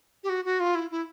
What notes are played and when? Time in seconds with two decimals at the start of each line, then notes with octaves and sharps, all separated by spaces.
0.24 G4
0.29 F#4
0.45 F#4
0.60 F4
0.75 E4
0.91 E4